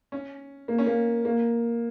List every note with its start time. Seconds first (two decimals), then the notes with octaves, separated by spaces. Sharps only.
0.12 C#4
0.68 A#3
0.78 C#4
0.86 A#3
1.25 A#3